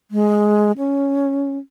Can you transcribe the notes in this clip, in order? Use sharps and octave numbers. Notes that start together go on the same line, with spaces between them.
G#3
C#4